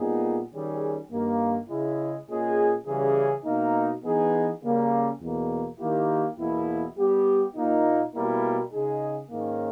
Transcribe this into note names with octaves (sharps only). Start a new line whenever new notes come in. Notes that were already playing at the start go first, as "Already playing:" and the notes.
Already playing: A#2 G3 B3 D#4 G#4
D#3 G3 C#4 G#4
G2 D#3 A#3
C#3 G#3 C#4 E4
A#2 G#3 C#4 G#4
C#3 E3 G3 C#4 G#4
B2 A#3 D#4
E3 G#3 B3 D#4 G#4
C#3 G3 A#3 C#4
E2 B2 A#3
D#3 A#3 E4 G4
E2 B2 A#3 E4
G3 B3 G4
A#2 A#3 D#4
B2 G3 A#3 E4 A#4
C#3 G#3 D#4 G#4
G#2 D#3 A#3 C#4